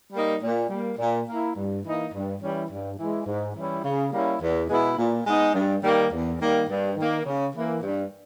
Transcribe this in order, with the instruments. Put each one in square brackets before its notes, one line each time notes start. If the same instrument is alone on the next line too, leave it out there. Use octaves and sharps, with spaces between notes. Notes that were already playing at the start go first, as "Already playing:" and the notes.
[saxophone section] G3 A#3 D#4
A#2
G3 A#3
A#2
A#3 E4
G2
E3 A#3 D#4
G2
E3 G3 C#4 E4
G2
E3 G#3
G#2
E3 G3 C#4 E4
C#3
G3 A#3 C#4 E4
E2
B2 G#3 B3 E4
A#2
G#3 B3 D#4
G2
D#3 G3 A#3
E2
D#3 G3 A#3
G2
D#3 A#3
C#3
E3 A#3
G2